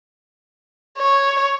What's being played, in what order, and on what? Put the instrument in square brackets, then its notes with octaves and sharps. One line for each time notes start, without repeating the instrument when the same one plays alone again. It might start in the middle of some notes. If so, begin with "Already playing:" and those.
[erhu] C#5